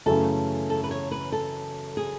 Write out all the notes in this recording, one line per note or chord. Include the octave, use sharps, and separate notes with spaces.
F#2 C#3 E3 A3 C#4 A4
A4
B4
C#5
B4
A4
G#4